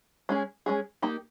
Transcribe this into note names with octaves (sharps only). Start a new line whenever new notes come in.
G#3 C#4 G#4
G#3 C#4 G#4
A#3 D#4 G4